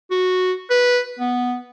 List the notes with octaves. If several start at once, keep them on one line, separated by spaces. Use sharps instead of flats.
F#4
B4
B3